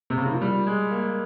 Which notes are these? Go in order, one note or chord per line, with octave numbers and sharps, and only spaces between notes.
C3
C#3
D#3
F3
G3
G#3
A#3